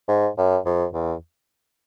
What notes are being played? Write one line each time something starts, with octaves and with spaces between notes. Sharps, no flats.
G#2
F#2
F2
E2